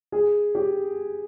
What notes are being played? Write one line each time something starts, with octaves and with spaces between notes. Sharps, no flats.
G#4
G4